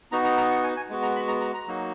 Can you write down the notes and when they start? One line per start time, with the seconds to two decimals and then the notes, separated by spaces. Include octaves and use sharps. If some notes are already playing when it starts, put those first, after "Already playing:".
0.12 B3 D#4 F#4 A#5
0.24 A#5
0.37 A#5
0.51 F#5
0.64 G#5
0.77 G#5
0.89 G#3 B3 F#4
1.02 A#5
1.16 B5
1.28 A#5
1.41 A#5
1.54 A#5
1.67 F#3 A#3 D#4 F#4